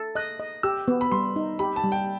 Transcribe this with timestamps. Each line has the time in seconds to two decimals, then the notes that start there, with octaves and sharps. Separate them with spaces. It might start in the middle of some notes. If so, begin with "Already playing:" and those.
Already playing: A4
0.15 D#5 F#6
0.40 D#5
0.63 G4 E6
0.88 B3
1.01 B5
1.12 G3 C6
1.36 D#4
1.59 G4 B5
1.76 A5
1.84 G3
1.92 G5